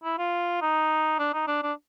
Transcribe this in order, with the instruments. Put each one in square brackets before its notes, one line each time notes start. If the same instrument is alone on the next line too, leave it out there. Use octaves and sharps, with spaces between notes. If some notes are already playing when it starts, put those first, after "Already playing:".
[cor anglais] E4
F4
D#4
D4
D#4
D4
D4